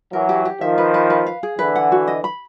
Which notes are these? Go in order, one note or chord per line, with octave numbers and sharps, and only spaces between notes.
E3 F#3 A#4
G4
G4
D#3 F3 E5
B4
B4
B4
F5
G#4
D3 E3 B4
F#5
F#4
D#5
B5